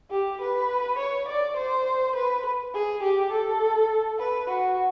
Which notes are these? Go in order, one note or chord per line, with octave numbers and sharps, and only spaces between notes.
G4
B4
C#5
D5
C5
B4
G#4
G4
A4
B4
F#4